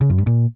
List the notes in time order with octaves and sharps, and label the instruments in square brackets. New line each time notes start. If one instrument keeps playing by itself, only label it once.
[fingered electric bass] C#3
F#2
G2
A#2